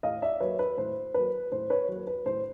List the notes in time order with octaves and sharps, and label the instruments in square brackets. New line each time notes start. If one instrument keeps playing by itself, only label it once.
[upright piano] A2 D#5 F5
D5 E5
F#3 A#3 B4 C#5
B4
A2 C5
F#3 A#3 B4
A2 C5
B4 C#5
F#3 A#3
B4
A2 C5